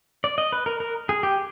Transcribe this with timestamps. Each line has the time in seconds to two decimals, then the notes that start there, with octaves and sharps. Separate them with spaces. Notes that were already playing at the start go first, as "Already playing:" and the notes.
0.24 D5
0.38 D#5
0.52 B4
0.66 A#4
0.80 A#4
1.09 G#4
1.23 G4